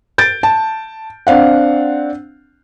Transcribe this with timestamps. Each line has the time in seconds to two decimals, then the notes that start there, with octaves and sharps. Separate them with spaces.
0.18 G6 A6 D7
0.43 A5
1.27 C4 D4 F5 F#5